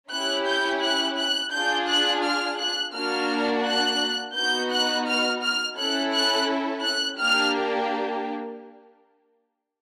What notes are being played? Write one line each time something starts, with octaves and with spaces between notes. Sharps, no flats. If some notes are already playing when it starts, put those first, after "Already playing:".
C#4 E4 G4 F#6
G6
F#6
F#6
D4 F4 G#4 G6
F#6
F6
F#6
A#3 D4 F#4 F6
F#6
B3 D#4 F#4 G6
F#6
F6
F6
C#4 E4 A4 F#6
F#6
F#6
A#3 D4 G4 F6